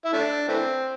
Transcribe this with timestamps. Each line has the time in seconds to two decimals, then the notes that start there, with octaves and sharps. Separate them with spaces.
0.05 E4
0.13 A3 D4
0.48 E3 A3 C4